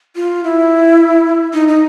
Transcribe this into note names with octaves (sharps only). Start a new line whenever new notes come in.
F4
E4
D#4
D#4